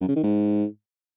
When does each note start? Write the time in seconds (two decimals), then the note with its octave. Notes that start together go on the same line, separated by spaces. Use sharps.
0.01 F#2
0.08 C#3
0.16 D#3
0.23 G#2